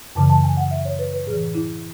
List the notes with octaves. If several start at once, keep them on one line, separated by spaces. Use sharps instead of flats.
F#2 C#3 E3 A5
A5
G#5
F#5
E5
C#5
B4
B4
A2 E3 G#4
E4